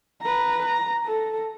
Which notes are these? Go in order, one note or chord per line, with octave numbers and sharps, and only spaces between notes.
B4 A#5
A#5
A4